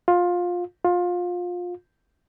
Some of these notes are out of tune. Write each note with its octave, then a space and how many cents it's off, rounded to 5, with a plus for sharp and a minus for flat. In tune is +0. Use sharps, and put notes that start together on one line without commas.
F4 +20
F4 +25